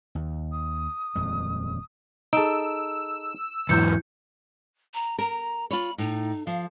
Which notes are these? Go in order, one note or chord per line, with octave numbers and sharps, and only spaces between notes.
D#2
D#6
D#1 F2 G#3
D#4 G#4 A4 E6 D7
E2 G#2 F#3 E4 G6 C#7
A#5
A#4 A#5
F4 C#5 B5
A2 D#4
F3 F5